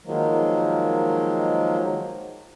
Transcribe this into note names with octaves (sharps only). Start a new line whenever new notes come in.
D#3 F3 F#3 G#3 A#3